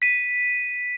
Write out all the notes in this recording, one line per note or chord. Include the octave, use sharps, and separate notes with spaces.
B6 D#7